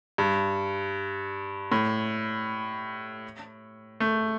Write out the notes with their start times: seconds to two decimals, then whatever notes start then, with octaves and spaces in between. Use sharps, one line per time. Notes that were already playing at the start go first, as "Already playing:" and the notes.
0.18 G2
1.72 A2
4.00 A3